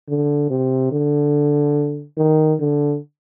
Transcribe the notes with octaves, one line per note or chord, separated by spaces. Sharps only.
D3
C3
D3
D#3
D3